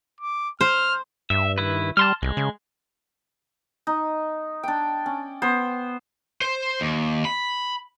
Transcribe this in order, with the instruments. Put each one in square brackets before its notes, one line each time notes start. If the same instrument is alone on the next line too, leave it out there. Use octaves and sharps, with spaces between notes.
[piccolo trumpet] D6
[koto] C5 [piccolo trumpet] F6
[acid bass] G2 [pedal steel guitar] E5
[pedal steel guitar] D#3 E4 B4
[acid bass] G3 [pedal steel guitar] A5 C6 F6
[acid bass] C2 [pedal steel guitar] G#3
[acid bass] C#3
[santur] D#4
D4 G5
C#4
B3 C5
[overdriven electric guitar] C5
D#2
B5